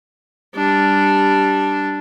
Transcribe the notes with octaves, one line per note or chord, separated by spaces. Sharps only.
G3 D4